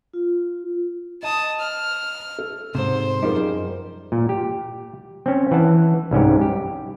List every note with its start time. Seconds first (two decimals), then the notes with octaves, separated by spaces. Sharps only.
0.14 F4
1.23 D#5 A5 D#6
1.59 F6
2.39 A4
2.75 G#2 C3 C5
3.22 F#2 F3 G3 D#4 G#4 A#4
4.12 A#2
4.29 G4
5.26 C4 C#4
5.51 E3 F#5 A5
6.11 C2 G#2 C#4 G4
6.41 G4